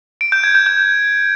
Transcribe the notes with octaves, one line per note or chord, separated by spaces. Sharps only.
D7
G6
G#6
G6
G6